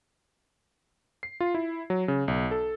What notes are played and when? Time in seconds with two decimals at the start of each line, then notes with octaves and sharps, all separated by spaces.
1.23 C7
1.40 F4
1.54 E4
1.90 F#3
2.08 C#3
2.28 B1
2.51 A4